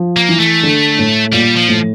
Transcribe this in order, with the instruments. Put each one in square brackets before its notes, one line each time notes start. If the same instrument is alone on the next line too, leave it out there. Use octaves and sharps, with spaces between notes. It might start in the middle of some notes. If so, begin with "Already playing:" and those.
Already playing: [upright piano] F3
[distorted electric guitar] A#3
[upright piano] E3
[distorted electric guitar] A3
[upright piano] D3
A2
[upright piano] A#2 [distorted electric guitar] G3
[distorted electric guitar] F3
[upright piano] A2